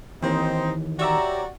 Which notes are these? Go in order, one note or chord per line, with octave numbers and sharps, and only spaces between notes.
D#2 E3 C4 D#4
F#4 G4 C#5 D5 E5 A#5